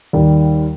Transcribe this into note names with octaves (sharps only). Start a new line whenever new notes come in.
D#2 D#3 G3